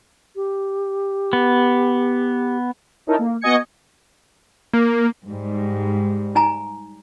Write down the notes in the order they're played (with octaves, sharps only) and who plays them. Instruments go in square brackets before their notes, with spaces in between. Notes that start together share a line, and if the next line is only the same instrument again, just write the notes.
[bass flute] G4
[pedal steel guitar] B3
[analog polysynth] C#4 D#4 E4 A4 A#4
A#3
B3 F#4 D#5 G#5 G#6 C#7
A#3
[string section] G#2 G3
[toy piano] D#4 G#5 A#5